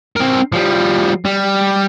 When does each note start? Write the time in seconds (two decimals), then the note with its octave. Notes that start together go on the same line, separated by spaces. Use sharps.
0.16 C4 A#4
0.53 F3 G3
1.25 G3